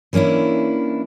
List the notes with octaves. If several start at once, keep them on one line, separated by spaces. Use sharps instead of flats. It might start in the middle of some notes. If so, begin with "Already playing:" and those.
E3 A#3 C#4 D4 E4